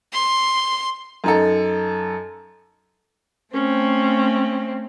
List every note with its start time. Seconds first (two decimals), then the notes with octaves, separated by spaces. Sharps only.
0.12 C6
1.24 F#2 D#4 A4
3.53 A3 C4 C#4